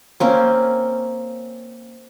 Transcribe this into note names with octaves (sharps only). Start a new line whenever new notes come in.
A#3 C4 C#4